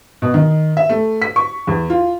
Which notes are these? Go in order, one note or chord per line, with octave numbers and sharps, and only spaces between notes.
B2
D#3
E5
A3
B6
C#6
E2
F4